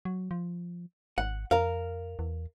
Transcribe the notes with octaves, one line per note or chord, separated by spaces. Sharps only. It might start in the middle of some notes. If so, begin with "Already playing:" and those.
F#3
F3
G#1 F#5
F2 A#4 F5
E2